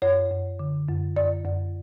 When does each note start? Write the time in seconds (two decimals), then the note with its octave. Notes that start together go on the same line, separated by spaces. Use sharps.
0.02 F#2 C#5
0.31 F#2
0.59 D3
0.88 F#2
1.16 F#2 D5
1.45 F#2